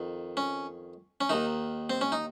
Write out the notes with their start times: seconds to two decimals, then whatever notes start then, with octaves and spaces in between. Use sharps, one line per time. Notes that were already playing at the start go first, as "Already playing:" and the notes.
Already playing: F2 D#3
0.37 C#4
1.21 C#4
1.29 D#2 D#3 D#4
1.90 C4
2.01 C#4
2.12 D#4